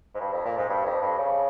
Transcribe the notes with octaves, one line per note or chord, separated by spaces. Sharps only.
G#2
G2
F2
A#2
G#2
G2
F2
G2
C#3